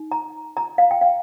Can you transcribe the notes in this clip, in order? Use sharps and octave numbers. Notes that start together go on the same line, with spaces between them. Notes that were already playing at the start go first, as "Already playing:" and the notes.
Already playing: D#4
A#5
A#5
F5
G5
F5